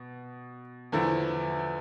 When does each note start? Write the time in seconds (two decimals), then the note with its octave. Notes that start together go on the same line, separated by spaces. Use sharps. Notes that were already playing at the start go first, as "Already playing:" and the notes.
Already playing: B2
0.92 E2 D3 F3 A3 E4